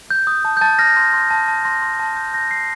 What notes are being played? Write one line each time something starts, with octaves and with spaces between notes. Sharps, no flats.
G6
D#6
A5
G6
A5 A6
F6 A#6
C6
C6
A5
A5
C6 A#6
C6
A5
G6
G6 A#6
G6 C7